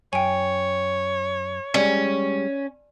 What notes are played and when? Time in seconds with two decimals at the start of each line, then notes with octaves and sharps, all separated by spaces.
0.13 F#2 C#5 G5 G#5
1.74 G3 G#3 C#4 D5 G#5